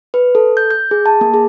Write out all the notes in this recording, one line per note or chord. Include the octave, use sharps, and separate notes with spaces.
B4
A4
G6
G6
G#4
A5
A#3
G#4